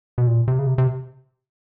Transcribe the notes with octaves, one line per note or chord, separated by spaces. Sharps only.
B2
A#2
C3
C#3
C3
C3